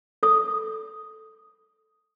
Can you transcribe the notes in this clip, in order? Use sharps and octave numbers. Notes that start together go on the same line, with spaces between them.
A4 D#6